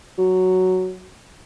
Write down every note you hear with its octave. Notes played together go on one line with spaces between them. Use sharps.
F#3